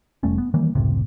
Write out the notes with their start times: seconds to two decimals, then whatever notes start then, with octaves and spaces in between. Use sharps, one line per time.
0.23 F1 G3 A3 C#4
0.38 B3
0.54 D#3 E3 G3 A#3
0.75 F#1 C#2 A2 C3